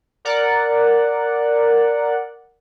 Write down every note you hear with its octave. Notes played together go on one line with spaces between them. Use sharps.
A#4 D5 F#5